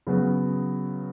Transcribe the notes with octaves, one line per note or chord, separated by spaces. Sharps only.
C#3 F#3 B3